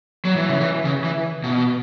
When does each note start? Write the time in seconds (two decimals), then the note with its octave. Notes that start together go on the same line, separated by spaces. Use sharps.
0.25 F#3
0.36 E3
0.49 C#3
0.61 E3
0.85 C#3
1.04 E3
1.44 B2